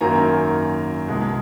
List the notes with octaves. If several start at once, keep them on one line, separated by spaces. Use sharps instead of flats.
G#1 F#2 D#3 F#3 A#3 G#5 A#5
C2 B2 G#3